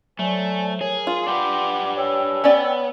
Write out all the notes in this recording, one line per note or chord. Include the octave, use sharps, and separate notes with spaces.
F#3 A3 C5 D5 G#5
G#4 A#4 C#5
F4 C6
D4 G4 B4 F#5 G5 D6
C#5 G5 G#5 E6
B3 C#4 D5